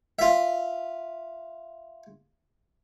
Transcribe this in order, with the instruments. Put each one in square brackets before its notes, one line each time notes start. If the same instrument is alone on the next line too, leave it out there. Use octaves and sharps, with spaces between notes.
[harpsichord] F4 E5